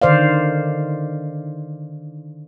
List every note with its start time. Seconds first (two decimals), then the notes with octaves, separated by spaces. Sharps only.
0.02 D3 D#3 C5 D5 F5